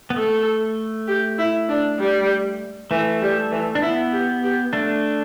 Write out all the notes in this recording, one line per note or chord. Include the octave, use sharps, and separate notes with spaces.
B3
A3 A4
G4
E4
D4
G3
E3 A3
G3
E3
D4
B3 E4
G4
G4
A3 D4